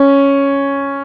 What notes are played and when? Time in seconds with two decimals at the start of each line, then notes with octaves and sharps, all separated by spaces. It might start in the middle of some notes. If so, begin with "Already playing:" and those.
Already playing: C#4